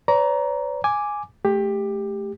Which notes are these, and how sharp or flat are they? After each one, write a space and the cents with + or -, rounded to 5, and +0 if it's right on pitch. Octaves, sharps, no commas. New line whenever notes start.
B4 +45 D5 -45 A#5 +10
G#5 +0 D6 +0
A3 -20 G4 +15